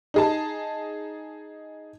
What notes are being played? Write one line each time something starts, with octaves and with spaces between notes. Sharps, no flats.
D#4 G#4 A5